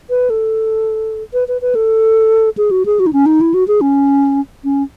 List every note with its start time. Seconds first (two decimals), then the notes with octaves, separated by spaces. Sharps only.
0.10 B4
0.30 A4
1.33 B4
1.48 B4
1.61 B4
1.75 A4
2.58 G#4
2.71 F#4
2.86 G#4
3.00 F#4
3.06 D#4
3.13 C#4
3.26 D#4
3.41 E4
3.54 F#4
3.68 G#4
3.81 C#4
4.64 C#4